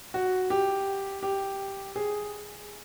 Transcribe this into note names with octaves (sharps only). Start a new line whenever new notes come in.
F#4
G4
G4
G#4